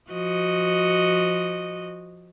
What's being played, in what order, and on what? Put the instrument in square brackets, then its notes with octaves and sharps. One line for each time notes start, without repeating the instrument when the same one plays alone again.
[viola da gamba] F3 F#4 D#5